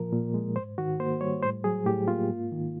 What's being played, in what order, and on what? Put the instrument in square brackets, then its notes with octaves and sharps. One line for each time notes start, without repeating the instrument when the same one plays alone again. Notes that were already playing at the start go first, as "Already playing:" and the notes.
Already playing: [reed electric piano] A#2 F3 A#4
A#2
G#3
G#2 C5
D#3 F#4
A#3 C5
G3 C#5
A2 C5
F#3 G#4
A2 G4
A#3 F4
G#2
D#3